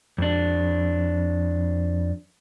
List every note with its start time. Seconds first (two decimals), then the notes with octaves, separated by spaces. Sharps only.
0.18 F2 D4